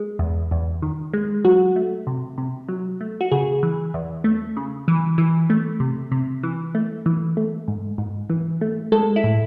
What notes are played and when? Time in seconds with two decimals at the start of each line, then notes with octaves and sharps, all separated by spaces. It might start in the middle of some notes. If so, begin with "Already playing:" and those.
Already playing: G#3
0.19 E2
0.51 E2
0.82 D#3
1.14 G#3
1.45 F#3 F#4
1.76 A3
2.07 C3
2.38 C3
2.68 F#3
3.01 A3
3.21 F#4
3.31 C#3 G#4
3.63 E3
3.94 E2
4.24 A3
4.57 C#3
4.88 E3
5.18 E3
5.50 A3
5.80 C3
6.12 C3
6.43 E3
6.75 A3
7.06 E3
7.37 A3
7.68 G#2
7.98 G#2
8.30 E3
8.61 A3
8.92 G#3 A4
9.16 E4
9.24 A2